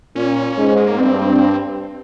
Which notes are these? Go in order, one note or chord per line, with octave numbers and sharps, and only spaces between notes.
A#2 C#4
G#2
G#3
A#3
G2 C4